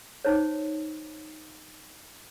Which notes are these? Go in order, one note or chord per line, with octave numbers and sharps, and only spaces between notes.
D#4 C5 C#5